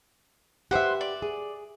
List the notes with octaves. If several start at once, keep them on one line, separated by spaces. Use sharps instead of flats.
G4 B4 C5 E5 F#5
D5
G#4